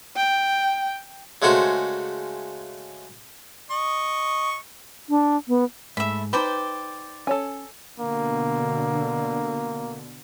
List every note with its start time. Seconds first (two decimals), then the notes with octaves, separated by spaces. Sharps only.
0.16 G5
1.42 C#3 G#3 A3 F#4 C5
3.71 D#5 C#6
5.09 D4
5.48 B3
5.97 G#2 A3 E5 B5
6.33 D#4 B4 C5 D5 G5 A5 B5
7.27 C#4 A4 C#5 G#5
8.00 B2 D3 A#3